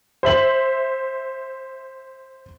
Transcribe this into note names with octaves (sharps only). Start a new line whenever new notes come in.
C5 E5 F#7